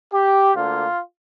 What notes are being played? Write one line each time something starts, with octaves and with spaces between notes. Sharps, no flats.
G4
D2 D3 A#3 F4